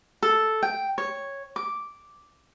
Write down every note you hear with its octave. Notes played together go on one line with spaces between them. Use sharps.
A4
G5
C#5
D6